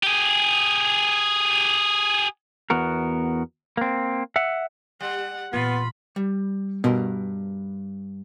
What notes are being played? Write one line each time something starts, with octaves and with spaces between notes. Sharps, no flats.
G4 G#4
E2 B3 F#4 A#4
A#3 C4
E5 F#5
G3 F#5
A#2 E3 B3 F4 B5
G3
G2 B2 A#4 C6